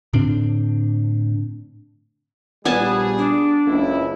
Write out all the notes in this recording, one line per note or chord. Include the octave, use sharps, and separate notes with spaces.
A2 D3 C4 D4
A#1 G3 B3 G#4 G#5 A5
D4
F#1 C#2 E4